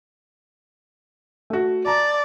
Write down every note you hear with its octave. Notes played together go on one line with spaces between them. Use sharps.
A3 F#4
D5 A5 A#5